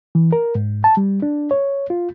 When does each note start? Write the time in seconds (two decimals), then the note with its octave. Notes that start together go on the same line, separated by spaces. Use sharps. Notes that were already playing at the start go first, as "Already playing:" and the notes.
0.15 E3
0.33 A#4
0.55 G#2
0.84 A5
0.97 G3
1.22 D4
1.51 C#5
1.90 F4